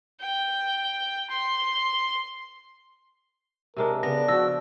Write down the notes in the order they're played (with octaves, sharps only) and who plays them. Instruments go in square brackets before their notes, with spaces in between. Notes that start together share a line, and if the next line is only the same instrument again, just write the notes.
[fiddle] G5
C6
[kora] C3 G#3 D4 [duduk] A#4
[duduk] C#3 [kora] B3 [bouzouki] D4 [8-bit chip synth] A#6
[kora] F3 [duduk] F#4 [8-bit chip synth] E6